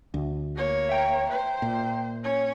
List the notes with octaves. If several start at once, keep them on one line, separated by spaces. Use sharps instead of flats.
D2
A#3 C#5
E5 G5 A#5
C5
A#2
C#4 C#5